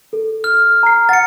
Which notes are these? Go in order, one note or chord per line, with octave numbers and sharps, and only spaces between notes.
A4
F6
A#5 C7
F#5 A6 C#7